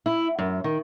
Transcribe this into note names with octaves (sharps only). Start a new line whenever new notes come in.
E4
F#2
D#3